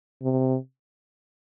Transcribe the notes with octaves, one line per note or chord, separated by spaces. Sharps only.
C3